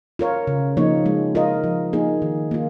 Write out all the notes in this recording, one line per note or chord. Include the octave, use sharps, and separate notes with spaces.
F4 A#4 C#5
C#3
F3 A#3 D#4 C#5
G#3
F4 A#4 D#5
F3
A#3 D#4 G#4
D#3
A#3 F4